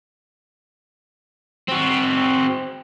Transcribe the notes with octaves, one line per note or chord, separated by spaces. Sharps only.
C4 F#4